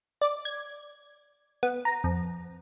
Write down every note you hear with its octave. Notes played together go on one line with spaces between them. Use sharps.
D5
G#6
B3
A#5
F2